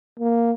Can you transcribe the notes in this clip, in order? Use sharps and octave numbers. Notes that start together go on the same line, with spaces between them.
A#3